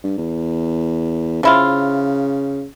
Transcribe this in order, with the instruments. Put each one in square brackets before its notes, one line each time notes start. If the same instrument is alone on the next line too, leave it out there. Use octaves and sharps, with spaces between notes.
[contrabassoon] G2
E2
[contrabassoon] C#3 [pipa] F3 E4 F4